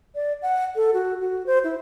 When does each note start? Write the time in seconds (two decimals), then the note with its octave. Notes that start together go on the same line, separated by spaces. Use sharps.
0.15 D5
0.42 F#5
0.76 A4
0.94 F#4
1.21 F#4
1.46 C5
1.64 E4